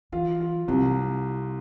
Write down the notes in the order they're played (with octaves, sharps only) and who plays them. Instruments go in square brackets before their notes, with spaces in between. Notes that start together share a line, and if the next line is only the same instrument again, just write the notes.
[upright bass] E3 [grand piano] F4
[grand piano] F4
[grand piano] C2 [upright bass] C4